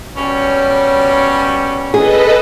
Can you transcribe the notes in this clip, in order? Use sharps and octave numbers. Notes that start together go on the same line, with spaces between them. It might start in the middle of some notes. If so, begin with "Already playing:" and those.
B2 G3 C#4
G#4 A4 B4 D#5